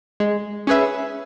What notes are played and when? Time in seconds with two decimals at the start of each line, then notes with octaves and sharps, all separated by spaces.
0.20 G#3
0.67 C#4 G#4 B4 E5